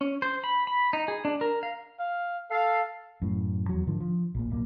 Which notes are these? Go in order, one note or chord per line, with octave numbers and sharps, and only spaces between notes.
C#4
C5
B5
B5
D#4
G#4
D4
A#4
F5
F5
A4 F5
F#2 A2
E2 F#3
G#2 D3 D#3 F3
F3
A#1 A#2
D1 B1 A#3